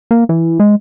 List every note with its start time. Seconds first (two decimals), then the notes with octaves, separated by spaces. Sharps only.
0.11 A#3
0.29 E3
0.59 G#3